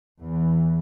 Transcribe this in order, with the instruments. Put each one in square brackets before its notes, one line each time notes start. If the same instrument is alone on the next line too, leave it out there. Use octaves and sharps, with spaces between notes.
[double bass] E2 E3